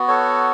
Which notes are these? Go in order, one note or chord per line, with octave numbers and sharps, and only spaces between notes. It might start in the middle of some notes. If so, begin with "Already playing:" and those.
Already playing: B3 F#4
A4 C#5